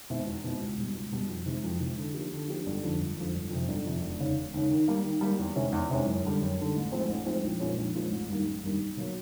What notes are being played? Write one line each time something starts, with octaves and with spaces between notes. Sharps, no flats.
B2 G#3 C4 E4
E2
B2 G#3 C4 E4
C#2
B2 G3
C#2
B2 G3
F2
C3 E3 G#3
F2
C3 E3 G#3
D3
F3 A#3 D4 G4
D3
F3 A#3 D4 G4
G1
F2 D3 F3
G1
F2 D3 F3
G1
F2 C3
G1
F2 C3
E1
D#2 C#3
E1
D#2 C#3
D#3
G3 A#3
D#3
G3 A#3
E2
C3 E3 G#3 C#4
E2
C3 E3 G#3 C#4
F#2
D3 G3
F#2
D3 G3
A1
A2 F3 G#3 C4
A1
A2 F3 G#3 C4
A#1
A#2 F3 G#3 C#4
A#1
A#2 F3 G#3 C#4
A1
G2 D#3 G3 A#3
A1
G2 D#3 G3 A#3
B1
B2 F#3 A#3